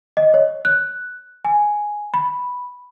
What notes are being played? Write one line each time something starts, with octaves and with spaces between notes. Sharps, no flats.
D#5
C#5
F#6
G#5
B5